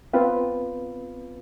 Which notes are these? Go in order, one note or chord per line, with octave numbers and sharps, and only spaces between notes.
B3 C4 F4 B4